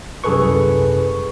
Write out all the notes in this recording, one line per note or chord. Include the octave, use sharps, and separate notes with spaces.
C2 F#2 G#4 A4 B4 C#6